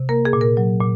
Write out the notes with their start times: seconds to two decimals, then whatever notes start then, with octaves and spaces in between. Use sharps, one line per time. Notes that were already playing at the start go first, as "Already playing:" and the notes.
Already playing: C3
0.09 A#3 A#4
0.25 G#4
0.33 A#2
0.41 A#4
0.57 F#3
0.80 A#2